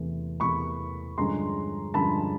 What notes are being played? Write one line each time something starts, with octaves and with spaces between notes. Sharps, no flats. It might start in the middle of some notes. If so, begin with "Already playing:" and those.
Already playing: E2 C3 E3 A3
E2 C3 E3 A3 B5 C#6
G2 D3 F3 G#3 C#4 A#5 C6
G2 D3 F3 G#3 C#4 A5 B5